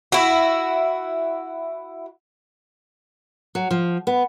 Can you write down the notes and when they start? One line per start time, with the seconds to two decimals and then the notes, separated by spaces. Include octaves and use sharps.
0.12 E4 F#4
3.55 F#3
3.71 F3
4.07 B3